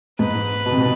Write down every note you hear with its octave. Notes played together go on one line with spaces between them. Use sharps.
G#2 B4
B2
C3
B2